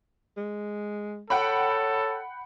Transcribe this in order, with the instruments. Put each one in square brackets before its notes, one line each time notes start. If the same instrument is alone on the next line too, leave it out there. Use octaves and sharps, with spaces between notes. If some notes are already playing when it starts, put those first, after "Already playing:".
[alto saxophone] G#3
[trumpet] A4 [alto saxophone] C#5 [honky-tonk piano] F#5 G5 B5